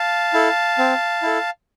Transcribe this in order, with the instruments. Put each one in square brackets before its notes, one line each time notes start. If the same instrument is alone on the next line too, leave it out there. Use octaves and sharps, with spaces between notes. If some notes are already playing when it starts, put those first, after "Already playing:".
Already playing: [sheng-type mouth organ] F5 A5
E4 A4
C4
E4 A4